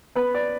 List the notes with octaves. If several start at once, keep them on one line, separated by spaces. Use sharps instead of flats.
B3 B4
D5